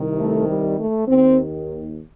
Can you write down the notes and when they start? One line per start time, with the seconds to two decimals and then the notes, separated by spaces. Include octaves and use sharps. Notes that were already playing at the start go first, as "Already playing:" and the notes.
Already playing: C2 C3 D#3
0.18 A3
0.47 G3
0.77 A3
1.06 D#2 D#3 C4